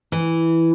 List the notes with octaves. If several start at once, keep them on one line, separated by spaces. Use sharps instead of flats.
E3